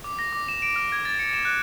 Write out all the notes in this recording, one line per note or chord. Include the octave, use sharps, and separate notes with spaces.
D6
A#6
D6
E7
D7
F6
G#6
A6
C#7
E7
F#6